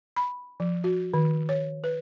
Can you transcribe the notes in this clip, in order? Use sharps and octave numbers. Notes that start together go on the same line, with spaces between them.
B5
F3
F#4
D#3
C#5
B4